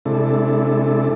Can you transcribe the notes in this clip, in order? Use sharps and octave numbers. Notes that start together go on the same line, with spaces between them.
C3 G#3 D4 E4 A4